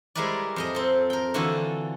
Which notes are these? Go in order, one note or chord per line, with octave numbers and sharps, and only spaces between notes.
G3 G#3 E4 A#4 B4 D5
F2 A#4 D#5
C4 A4
A#4 G5
D3 E3 F4 F#4 A4